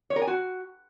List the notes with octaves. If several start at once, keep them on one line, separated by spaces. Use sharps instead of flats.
C#5
A#4
G#5
F#4